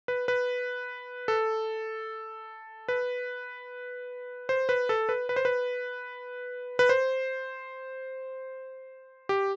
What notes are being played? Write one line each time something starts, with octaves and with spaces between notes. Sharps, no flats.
B4
B4
A4
B4
C5
B4
A4
B4
B4
C5
B4
B4
C5
G4